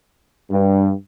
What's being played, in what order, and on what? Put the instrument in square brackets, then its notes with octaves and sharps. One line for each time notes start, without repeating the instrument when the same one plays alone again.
[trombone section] G2